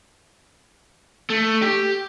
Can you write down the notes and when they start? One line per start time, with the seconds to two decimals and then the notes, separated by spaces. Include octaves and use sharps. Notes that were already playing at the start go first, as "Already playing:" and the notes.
1.30 A3
1.62 G4